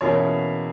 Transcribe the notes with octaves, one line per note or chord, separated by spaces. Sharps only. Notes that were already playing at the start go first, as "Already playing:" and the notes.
E2 B2 A#3 C#4 E4 C#5